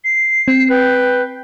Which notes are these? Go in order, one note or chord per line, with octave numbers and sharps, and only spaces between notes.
C7
C4
B4 G5